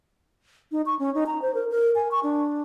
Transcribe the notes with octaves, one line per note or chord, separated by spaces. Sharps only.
D#4
C#6
C#4
D#4
A#5
C5
A#4
A#4
G#5
C#6
D4